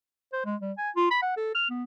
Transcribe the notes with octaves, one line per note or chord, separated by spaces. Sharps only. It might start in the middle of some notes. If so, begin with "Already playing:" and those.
C5
G#3
G3
G#5
F4
B5
F#5
A4
F6
B3